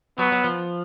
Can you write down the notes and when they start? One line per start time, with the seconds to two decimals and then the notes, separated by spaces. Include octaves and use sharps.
0.19 F#3 B3
0.32 F#3
0.44 F3